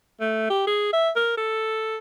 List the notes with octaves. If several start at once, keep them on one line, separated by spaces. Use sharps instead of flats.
A3
G4
G#4
E5
A#4
A4